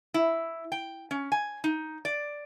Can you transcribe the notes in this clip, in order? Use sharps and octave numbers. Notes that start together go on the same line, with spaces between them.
E4
G5
C#4
G#5
D#4
D5